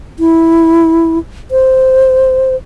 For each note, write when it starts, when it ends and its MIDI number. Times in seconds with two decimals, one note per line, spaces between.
0.19 1.18 64
1.51 2.56 72